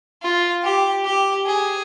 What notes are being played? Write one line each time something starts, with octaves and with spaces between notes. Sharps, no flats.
F4
G4
G4
G#4